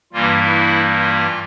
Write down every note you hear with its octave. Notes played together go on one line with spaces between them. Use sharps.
G2 E3 G3 A#3 F4
E4
F4